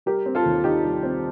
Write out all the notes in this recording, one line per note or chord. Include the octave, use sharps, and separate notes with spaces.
G3 G4 A#4
C4
F4 A4
D#2
D#3 D#4 G4
G3
C4